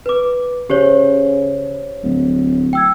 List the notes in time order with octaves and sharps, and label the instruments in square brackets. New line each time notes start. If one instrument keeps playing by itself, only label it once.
[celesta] B4 D6
[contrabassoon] C#3 [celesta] G4 C5 C#5
[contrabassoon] D1
[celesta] G5 E6 G#6